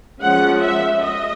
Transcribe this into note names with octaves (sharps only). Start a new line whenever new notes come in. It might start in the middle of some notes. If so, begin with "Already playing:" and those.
F3 G#3 C#4 F#5
E5
D#5